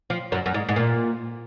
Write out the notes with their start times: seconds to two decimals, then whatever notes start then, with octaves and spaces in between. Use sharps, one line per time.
0.10 F3
0.32 F#2
0.46 F#2
0.54 G#2
0.69 G#2
0.76 A#2